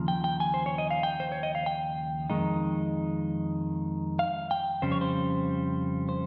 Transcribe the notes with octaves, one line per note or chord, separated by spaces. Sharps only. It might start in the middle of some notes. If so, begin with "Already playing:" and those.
Already playing: D#2 C#3 F3
G5
G5
G#5
C5
C#5
D#5
F5
G5
C5
C#5
D#5
F5
G5
F2 D#3 G#3 D#4
F5
G5
F2 C#3 G3 C#4 C5
C#5
C5
C5